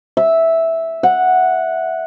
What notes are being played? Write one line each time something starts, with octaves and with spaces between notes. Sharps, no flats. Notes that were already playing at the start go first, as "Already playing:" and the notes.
E5
F#5